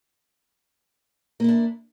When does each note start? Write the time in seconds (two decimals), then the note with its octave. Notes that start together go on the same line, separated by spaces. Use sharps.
1.40 A#3
1.44 E4
1.48 D4